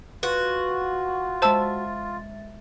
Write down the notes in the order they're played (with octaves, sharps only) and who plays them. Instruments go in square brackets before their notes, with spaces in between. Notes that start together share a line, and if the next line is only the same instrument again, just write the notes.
[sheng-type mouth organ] F4 [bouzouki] F#4 [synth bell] B4
[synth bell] G#3 E5 A6 [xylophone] C5 A5 E6